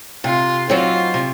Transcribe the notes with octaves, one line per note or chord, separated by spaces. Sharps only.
C3 F4
F#3 C4 D#4 F4
C3